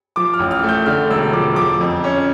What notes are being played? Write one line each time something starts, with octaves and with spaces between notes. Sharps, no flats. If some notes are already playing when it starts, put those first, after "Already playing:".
F3 D6
F6
A1
F6
A3
G6
D3 F6
E1 E6
F3 D6
F3 D6
F2
C#4